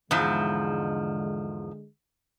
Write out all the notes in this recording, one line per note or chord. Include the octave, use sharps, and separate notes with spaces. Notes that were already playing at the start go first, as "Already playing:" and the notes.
E2 G#2 D3 F3 G#3